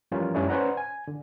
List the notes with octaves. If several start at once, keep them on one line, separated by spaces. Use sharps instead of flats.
E3 F3 G3 C#4 F4 A#4
F#2 G3 A3 C#4 D4 E4
C#4 B4 C5 D5 F#5 A#5
G#5
D3